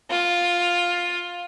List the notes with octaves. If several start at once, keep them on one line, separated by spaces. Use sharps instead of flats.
F4